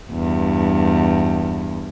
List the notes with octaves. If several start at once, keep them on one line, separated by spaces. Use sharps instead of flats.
E2 G2